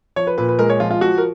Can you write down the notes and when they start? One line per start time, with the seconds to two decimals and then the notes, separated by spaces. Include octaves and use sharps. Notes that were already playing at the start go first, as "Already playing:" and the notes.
0.16 F3 C#5
0.27 B4
0.38 A#2 B4
0.49 B4
0.59 G#3 A#4
0.70 C#5
0.80 F3 F4
0.91 F4
1.01 F3 F#4
1.18 A#4